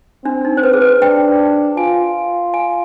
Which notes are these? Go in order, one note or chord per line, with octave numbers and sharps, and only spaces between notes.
C4 D4
D#4
C5
B4
G#4
B4
D4 G5
F4 G#5
G#5